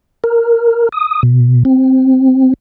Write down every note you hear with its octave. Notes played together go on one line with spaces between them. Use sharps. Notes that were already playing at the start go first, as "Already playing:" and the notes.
A#4
D#6
B2
C4